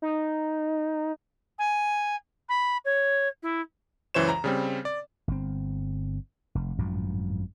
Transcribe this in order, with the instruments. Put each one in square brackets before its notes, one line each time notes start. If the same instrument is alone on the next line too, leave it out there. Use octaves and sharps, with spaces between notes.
[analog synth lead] D#4
[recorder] G#5
B5
C#5
E4
[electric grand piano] C#2 F#2 E3 C5 C#5 E7
A#5
C#3 G3 C4
D5
[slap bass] G1 C4
F1
G#1 F#2 A2 F3